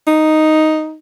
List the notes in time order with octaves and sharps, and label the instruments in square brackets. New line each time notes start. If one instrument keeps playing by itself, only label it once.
[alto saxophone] D#4